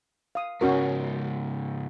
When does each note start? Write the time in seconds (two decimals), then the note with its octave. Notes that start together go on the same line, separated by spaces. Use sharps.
0.35 F5 D#6
0.61 G#2 C#3 C#4 F#4 A#4